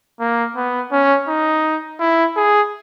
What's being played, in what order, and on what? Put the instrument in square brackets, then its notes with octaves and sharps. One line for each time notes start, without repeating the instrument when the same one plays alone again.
[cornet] A#3
B3
C#4
D#4
E4
G#4